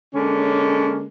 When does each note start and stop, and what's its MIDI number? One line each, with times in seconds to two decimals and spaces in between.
0.15 1.08 50
0.15 1.08 56
0.15 1.08 58
0.15 1.08 61